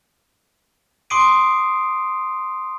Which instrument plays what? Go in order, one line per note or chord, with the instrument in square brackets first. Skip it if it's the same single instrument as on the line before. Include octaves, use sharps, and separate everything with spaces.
[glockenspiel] C6 D6 D#6 C7 D7 D#7